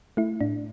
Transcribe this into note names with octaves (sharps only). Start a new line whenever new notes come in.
A3 E4
A2 D4